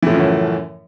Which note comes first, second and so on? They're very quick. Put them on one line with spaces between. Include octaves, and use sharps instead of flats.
E3 A2 F3 C#3 F#2